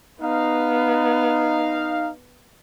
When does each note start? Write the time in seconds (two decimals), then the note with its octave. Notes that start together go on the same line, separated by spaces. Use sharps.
0.21 B3 D#4 F5